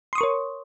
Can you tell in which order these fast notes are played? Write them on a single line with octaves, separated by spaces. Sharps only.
C6 D#6 C#6 A#4 C#5